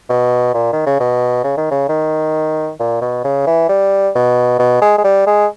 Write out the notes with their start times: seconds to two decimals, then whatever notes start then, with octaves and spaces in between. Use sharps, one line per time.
0.09 B2
0.54 A#2
0.72 D#3
0.86 C#3
1.00 B2
1.44 C#3
1.57 D#3
1.71 C#3
1.89 D#3
2.79 A#2
3.01 B2
3.24 C#3
3.47 E3
3.69 G3
4.15 B2
4.59 B2
4.81 G#3
4.98 G#3
5.04 G3
5.26 G#3